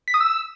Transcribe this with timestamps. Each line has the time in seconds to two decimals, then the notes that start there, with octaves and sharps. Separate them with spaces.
0.08 B6
0.14 D#6
0.20 E6